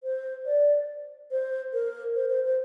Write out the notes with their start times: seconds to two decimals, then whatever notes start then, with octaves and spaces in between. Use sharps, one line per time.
0.04 C5
0.46 D5
1.31 C5
1.73 A#4
2.15 C5
2.30 C5
2.45 C5